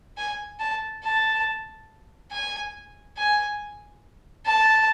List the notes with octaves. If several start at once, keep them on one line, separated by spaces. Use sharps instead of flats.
G#5
A5
A5
G#5
G#5
A5